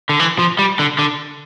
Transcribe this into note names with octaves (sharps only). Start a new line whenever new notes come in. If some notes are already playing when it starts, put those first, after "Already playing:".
D3
E3
F3
G3
D3
D3